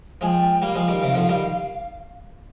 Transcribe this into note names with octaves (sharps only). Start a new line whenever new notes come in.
F3 G#3 G#5
G5
G3 A#3 F5
F3 G#3
D#3 G3
C3 D#3
D3 F3
D#3 G3